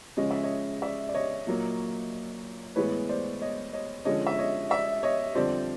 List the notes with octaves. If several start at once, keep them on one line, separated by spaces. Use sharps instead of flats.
C#3 F3 G#3 C#4 D#5
E5
C#5 D#5
D5 E5
D5
C#5 D#5
A#2 F#3 A#3
A2 E3 G#3 B3 B4 C#5
C5 D5
C#5 D#5
C#5 D#5
D3 F3 G#3 C#4 C#5 D#5
E5
C#5 D#5
D5 E5
C#5 D#5
F2 D3 G3 C4 C5 D5